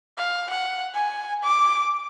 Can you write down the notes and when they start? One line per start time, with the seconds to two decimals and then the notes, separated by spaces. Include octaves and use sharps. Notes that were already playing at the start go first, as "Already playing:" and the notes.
0.17 F5
0.50 F#5
0.94 G#5
1.43 D6